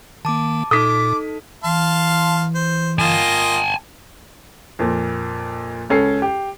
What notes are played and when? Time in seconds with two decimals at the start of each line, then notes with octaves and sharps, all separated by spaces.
0.25 D#3 A#3 A5 D6
0.71 A#2 D#4 A4 D6 D#6 B6
1.64 E3 F5 A5 C6
2.55 C5
2.99 A#3 F4 D#5 G#5 A5
4.79 F2 A#2
5.90 C#2 C#4 A4 C7
6.22 G4